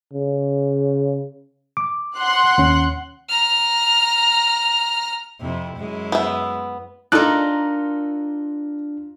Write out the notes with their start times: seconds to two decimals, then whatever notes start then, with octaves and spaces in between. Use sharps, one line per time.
0.14 C#3
1.77 D6
2.18 F#5 C6 F#6
2.58 D#2 C#4
3.29 A#5 F6
5.40 F2 C3 E4
5.77 F#2 G#3 E4
6.12 B3 E5
7.12 D4 D#4 F4 A4 A#4 D5 F#6